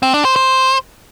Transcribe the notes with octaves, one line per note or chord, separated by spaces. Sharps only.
C4
D4
C5
C5